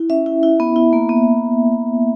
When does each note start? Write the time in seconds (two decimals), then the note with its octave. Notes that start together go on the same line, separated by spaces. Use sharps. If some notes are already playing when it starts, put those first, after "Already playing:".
Already playing: E4
0.10 C#4 E5
0.26 E4
0.43 E4
0.60 B3
0.76 E4
0.93 A#3
1.09 B3